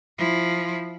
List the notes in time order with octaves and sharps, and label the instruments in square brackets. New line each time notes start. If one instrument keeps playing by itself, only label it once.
[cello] F3 E4